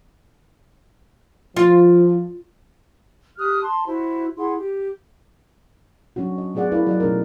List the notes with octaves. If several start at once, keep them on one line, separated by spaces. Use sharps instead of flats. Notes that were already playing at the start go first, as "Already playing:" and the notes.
F3 F4
G4 D#6 F6 F#6
A5 C6
E4 F#4 C5
E4 G#4 F#5 C6
G4
F#3 C#4 D4 F#4
D#5
F#3 A3 B3 G#4 D5 F#5
E4 A#4 B4 D5 F5
F#3 D5 D#5
B2 A3 C#4 D#4 A#4